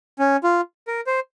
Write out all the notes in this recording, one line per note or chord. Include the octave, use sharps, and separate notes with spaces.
C#4
F4
A#4
C5